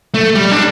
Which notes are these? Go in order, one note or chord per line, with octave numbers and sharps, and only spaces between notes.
A3
G3
D4